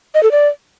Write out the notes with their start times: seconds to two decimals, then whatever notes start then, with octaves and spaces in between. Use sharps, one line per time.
0.15 D#5
0.23 A4
0.32 D5